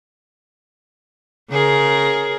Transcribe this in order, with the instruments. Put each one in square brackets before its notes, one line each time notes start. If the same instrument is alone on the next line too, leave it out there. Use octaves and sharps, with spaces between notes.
[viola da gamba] C#3 G#4 A#4